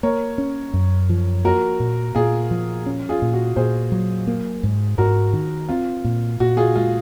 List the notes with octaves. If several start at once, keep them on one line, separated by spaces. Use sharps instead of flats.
A#3 A#4 C#5
C#4
F#2
F3
A#3 F#4 A#4
A#2
A#2 F4 G#4
F3
C#4
F4 G#4
A#2
F#4
A#2 G#4 C5
F#3
A#3
G#2
G#2 F#4 A#4
D#3
C4 F4
A#2
A#2 F#4
F4 G#4
G#3 F4